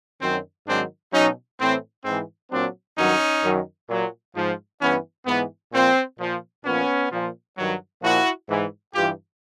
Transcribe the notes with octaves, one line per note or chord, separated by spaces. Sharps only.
F#2 D#3 F#3 C4
G#2 D#3 F#3 C4 D4
B2 F#3 C#4 D#4
A2 E3 C4
G#2 E3 C4
A#2 F#3 C4 D4
G2 D#3 F#3 C#4 D#4
F#2 D#3 F#3
A#2 F#3
G#2 F3
G2 E3 B3 C#4
G#2 E3 B3
A#2 F3 C4
A#2 F3
A#2 F3 B3 C#4
A#2 F3
G2 D#3 F#3
A#2 F3 E4 F#4
G#2 E3
G2 E3 F4 G4